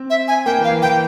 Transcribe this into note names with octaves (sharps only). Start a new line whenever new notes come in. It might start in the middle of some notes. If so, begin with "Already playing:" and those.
Already playing: C4
E5
G#5
A#3 G5
E3
F5
E3
E3 G5